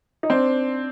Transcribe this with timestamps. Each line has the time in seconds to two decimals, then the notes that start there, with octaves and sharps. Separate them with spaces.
0.23 D#4
0.30 C4 D4